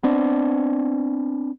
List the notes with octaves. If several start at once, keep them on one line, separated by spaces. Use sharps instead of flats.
B3 C4 D4